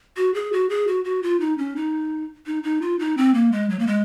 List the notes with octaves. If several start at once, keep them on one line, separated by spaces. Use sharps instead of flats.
F#4
G#4
F#4
G#4
F#4
F#4
F4
D#4
C#4
D#4
D#4
D#4
F4
D#4
C4
A#3
G#3
F#3
A#3
G#3